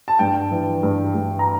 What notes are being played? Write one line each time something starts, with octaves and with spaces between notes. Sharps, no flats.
A5
G2 G5
E3
G2
G2
A#5